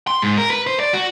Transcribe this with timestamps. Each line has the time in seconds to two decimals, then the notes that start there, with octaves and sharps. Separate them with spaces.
0.07 C6
0.22 G#2
0.37 A#4
0.50 B4
0.67 C5
0.80 D5
0.93 F#4